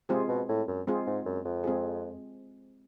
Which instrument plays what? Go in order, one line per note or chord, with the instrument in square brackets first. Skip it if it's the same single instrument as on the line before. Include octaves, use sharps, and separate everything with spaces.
[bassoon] C3 [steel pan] G#3 C4 F4 G#4
[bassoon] B2
A2
F#2
[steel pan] G#3 C4 F4 G#4
[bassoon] G#2
F#2
F2
[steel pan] G#3 C4 F4 G#4